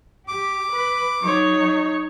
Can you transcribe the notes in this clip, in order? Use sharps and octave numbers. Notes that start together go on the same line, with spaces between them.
G4 D6
B4
F#3 D#4 C#5